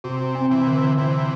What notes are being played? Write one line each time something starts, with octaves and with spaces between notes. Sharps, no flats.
C3 F#4
C4
C3 E3
D3
C3 E3 C5